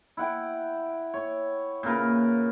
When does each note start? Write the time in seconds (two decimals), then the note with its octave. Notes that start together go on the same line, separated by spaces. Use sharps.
0.17 E4 F#5 G5
1.14 C#5
1.83 A#2 C#3 A#4 B4